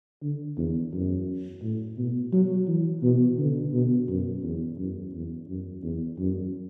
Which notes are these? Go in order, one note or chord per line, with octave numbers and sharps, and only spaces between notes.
D3
E2
F#2
A2
B2
F#3
E3
B2
D3
B2
F#2
E2
F#2
E2
F#2
E2
F#2